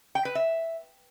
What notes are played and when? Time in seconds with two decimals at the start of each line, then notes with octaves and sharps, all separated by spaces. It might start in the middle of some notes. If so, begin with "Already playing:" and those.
0.15 G5
0.25 B4
0.35 E5